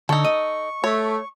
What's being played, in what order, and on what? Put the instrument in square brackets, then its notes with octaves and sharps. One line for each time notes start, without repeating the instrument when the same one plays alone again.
[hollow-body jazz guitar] D3 [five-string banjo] D#4 A4 [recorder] C#6
[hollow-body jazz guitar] D#5
[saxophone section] A3 [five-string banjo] C#5